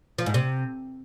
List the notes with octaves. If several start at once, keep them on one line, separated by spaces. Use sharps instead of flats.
F3
G#2
C3